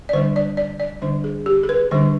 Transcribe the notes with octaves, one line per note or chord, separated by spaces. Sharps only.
D5
D3 G3 D4 C5
D5
D5
D5
D3 G3 D4 C5
G#4
G4
G#4
B4
D3 G3 D4 C5